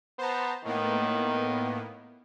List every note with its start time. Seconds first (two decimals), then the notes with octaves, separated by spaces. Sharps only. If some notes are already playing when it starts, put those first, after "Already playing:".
0.19 B3 C5 A5 A#5
0.65 A2 D#3 A#3 B3